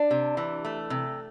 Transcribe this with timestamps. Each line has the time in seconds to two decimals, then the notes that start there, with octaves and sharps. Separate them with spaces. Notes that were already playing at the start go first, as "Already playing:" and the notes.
Already playing: D4
0.11 C3
0.37 E3
0.65 A3
0.90 C3